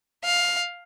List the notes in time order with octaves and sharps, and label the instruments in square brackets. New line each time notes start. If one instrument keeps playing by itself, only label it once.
[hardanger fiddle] F5